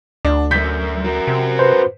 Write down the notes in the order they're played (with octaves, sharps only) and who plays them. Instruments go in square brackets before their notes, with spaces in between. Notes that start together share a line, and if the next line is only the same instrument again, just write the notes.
[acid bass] D2 [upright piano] D4
[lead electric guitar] C#2 F#2 [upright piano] G6 B6
[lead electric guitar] F#4 A#4
[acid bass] C3
[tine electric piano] B4 C5